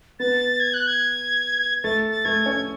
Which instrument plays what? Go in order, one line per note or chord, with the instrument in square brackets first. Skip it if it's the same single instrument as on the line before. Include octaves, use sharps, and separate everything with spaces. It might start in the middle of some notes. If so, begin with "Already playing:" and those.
[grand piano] B3 [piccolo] A6
[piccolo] G#6
F#6
G#6
[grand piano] A3 [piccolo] A6
[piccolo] A6
[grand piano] A3 [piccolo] G#6
[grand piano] C#4